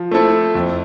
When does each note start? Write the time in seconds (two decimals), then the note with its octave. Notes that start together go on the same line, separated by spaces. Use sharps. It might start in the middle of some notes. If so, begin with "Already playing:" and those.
Already playing: F3
0.11 A3 C4 E4 A4
0.55 F2